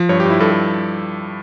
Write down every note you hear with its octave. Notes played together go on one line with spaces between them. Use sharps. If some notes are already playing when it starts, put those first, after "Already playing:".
Already playing: F3
G2 C#5
G4
G2 E4
G2 A4
A4